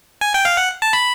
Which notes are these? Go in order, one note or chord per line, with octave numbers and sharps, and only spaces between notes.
G#5
G5
F5
F#5
A5
B5